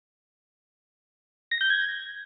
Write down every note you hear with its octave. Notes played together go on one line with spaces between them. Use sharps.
A#6
G6
G#6